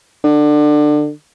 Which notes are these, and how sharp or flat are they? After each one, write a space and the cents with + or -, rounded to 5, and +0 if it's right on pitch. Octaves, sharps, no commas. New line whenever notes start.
D3 +25